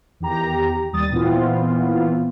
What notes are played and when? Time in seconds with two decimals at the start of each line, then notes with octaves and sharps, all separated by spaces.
0.20 E2 D#3 G4 A#5
0.93 D#2 G3 D#6 A6
1.11 A#2 E3 B3 C4 F4